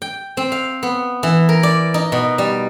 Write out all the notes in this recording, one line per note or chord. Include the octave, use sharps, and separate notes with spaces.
G5
C4
F5
B3
E3
A#4
D5
D#4
B2
G3